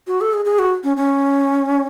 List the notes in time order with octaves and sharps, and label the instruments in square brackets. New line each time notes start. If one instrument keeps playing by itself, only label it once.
[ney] F#4
A4
G#4
G#4
F#4
C#4
C#4